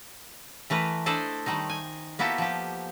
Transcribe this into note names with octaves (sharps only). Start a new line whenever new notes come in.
E3 A3 A#4 B4
D4 E4 A4 C5 D5 D#5
D#3 G3 A3 D#4
G#5
A#3 B3 E4 F#4 G4 A4
F3 G4